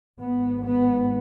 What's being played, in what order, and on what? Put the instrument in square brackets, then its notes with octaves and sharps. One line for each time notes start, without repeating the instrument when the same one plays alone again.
[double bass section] G#1 G#2 B3
B3